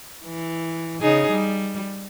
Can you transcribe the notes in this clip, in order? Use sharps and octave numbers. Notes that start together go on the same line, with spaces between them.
E3
C#3 D#4 G#4
G3